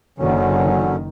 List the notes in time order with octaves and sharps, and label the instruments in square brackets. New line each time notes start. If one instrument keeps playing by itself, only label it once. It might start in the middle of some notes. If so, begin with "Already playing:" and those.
[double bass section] F#1 D#3 [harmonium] D3 F#3 C#4